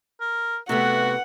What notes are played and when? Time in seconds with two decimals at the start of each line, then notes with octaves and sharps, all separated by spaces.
0.21 A#4
0.69 C3 A3 B3 F#4 F#5